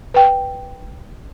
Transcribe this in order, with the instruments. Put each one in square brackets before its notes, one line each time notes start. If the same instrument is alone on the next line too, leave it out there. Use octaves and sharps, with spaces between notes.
[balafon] B4 G5